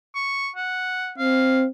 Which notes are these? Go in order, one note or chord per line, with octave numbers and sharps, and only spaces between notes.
C#6
F#5
C4 F5